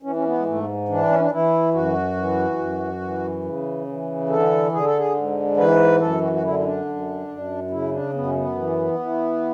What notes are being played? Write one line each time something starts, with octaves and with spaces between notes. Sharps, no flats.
E3 C#4
C#4
B3
G#3
G#2 A3
E3 D4
C#4
D4
E3 E4
F#2 F#4
E3
F#2
E3
C#3
E3
D3 A4
D3 G#4
A4
G#4
G#2
E3 B4
F#2 A4
F#4
F#4
D3 E4
E4
D4
F#2
F#2
C#3 E4
D4
F#2 B3
C#4
B3
E3
E3